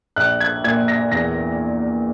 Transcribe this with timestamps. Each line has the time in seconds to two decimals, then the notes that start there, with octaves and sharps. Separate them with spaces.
0.16 A#1 F#6
0.40 G#6
0.64 A#2 G#6
0.88 A#6
1.12 E2 A#6